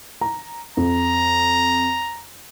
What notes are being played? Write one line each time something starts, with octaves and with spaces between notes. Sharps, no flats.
A#5
F2 A#5